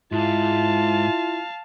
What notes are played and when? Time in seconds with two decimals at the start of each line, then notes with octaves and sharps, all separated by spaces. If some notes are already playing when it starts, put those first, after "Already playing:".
0.12 G#2 E4 F4 F5 A5